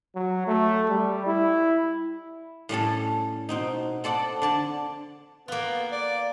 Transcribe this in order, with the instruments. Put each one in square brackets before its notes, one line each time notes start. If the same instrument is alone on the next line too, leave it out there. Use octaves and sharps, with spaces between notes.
[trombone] F#3
A3
G3
E4
[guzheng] A2 G3 C#4 A4
B2 C4 D#4
C4 A4 D5 F#5
D3 D5 A5
[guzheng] A#3 F4 [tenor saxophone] B3
[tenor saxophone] D5